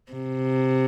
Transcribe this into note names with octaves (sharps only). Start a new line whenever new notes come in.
C3